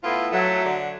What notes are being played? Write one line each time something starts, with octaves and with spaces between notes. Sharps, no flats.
A2 B3 E4 F4
F#3 A3
D3